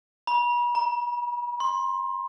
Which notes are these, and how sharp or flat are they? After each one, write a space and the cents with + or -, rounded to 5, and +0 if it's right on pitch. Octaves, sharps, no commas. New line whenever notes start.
B5 -40
A#5 +25
C6 +25